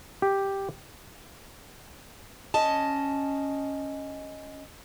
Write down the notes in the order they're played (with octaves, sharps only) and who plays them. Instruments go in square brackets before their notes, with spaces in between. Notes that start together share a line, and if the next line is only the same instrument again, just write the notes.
[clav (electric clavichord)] G4
[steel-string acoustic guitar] C#4 D#5 A5